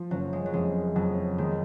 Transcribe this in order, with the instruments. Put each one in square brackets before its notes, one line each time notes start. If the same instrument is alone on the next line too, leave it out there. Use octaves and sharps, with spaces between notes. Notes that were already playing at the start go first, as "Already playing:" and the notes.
Already playing: [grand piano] F3
[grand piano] F#1 [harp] F#3
[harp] G#3
F#3
[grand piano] F2 [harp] G#3
[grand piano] F2 [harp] F#3
[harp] D#3 [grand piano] G#3